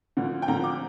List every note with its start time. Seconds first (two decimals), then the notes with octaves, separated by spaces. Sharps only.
0.17 D2 D3 F3
0.42 G5
0.48 D2 D3 F3 A#5
0.64 D6